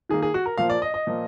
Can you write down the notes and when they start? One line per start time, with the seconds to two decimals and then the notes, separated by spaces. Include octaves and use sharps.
0.09 D#3 G#4
0.14 A#3
0.22 G#4
0.34 F#4
0.46 A#4
0.58 A#2 F3 A#3 F5
0.70 D5
0.82 D#5
0.94 D#5
1.07 A#2 F3 A#3